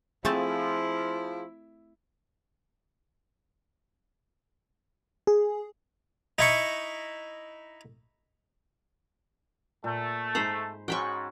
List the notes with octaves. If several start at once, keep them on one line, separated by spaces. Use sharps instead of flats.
F3 A3 C4 E4 G#4 A5
G#4
D#4 E4 C#6
A#2 A3
G#2 C5 A#5 B5
G#2 C#4 F#4 G5 B5 C#6